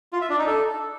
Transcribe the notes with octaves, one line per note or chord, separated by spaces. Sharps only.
F4
E5
D4
D#4
A4